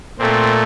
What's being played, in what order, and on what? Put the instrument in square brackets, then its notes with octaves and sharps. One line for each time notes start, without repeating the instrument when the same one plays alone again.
[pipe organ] A#2 A3 C4